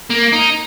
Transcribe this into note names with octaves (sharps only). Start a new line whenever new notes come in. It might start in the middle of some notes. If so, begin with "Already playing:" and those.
A#3
D#4